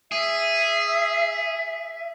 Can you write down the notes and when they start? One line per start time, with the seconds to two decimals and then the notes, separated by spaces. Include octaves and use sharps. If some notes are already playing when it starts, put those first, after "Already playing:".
0.12 G#4 E5